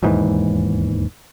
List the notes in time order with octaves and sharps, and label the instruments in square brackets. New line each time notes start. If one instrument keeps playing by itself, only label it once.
[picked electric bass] E1 D#2 G#2 E3